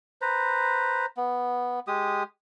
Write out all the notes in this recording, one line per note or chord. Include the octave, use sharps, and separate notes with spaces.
B4 C5 A#5
B3
G#3 G4 D#6